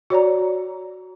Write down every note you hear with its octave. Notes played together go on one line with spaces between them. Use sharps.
F#4 C#5 D5 A#5